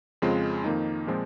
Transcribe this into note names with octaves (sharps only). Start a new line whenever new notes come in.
F2 C#3 G#3 C4 F4
F2 D#3 A#3 D#4
A#2 F3 G#3 C4